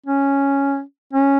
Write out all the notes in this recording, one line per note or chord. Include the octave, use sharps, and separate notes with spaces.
C#4
C#4